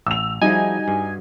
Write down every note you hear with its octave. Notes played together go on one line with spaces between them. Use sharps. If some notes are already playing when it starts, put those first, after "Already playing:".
A1 E6 F7
F3 G3 D#4 E4 F#4 G#4 G#5
G2